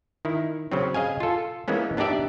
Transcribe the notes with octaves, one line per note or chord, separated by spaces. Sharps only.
D#3 E4
C#3 F#3 C4
G#4 D#5 F5 G#5
F4 A4
E3 G#3 A#3 B3 C#4
B3 D4 D#4 G4 D5 E5